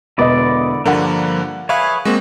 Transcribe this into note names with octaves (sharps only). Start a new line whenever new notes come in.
E1 D3 B3 E4 D5 D#5
G2 D3 F3 G3 A#3 D4 A#4 F#5
G#4 B4 C#5 E5 F5 C#6
G#3 A#3 C4 F#4